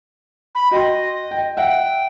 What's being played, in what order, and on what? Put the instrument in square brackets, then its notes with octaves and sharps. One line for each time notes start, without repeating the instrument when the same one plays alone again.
[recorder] B5
[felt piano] F#4 G5 C6 [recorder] D#5
[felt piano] G5
[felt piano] E5 F#5 [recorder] G5